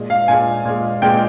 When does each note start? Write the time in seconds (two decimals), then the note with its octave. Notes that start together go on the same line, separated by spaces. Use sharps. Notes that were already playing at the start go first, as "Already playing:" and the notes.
Already playing: A#2 G#3
0.10 F5
0.28 A#2 G#3 G#5
0.65 A#2 G#3
1.02 A#2 G#3 G5